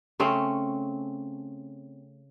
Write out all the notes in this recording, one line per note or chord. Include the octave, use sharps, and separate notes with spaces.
C#3 A3 C4 C#4